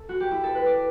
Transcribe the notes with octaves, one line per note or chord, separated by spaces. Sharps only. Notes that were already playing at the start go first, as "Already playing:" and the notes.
Already playing: A4
F#4
G4
E4
A4
B4
D5